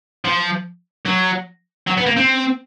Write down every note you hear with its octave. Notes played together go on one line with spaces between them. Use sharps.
F3
F#3
F#3
B3
A#3
C4